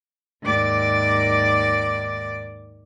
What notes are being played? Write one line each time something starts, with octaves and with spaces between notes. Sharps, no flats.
D#2 G#2 D5 D6 A6